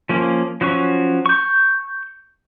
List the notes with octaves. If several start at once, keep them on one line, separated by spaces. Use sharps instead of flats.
F3 A#3 C#4
F3 F#3 C#4 C#6
C#6 G6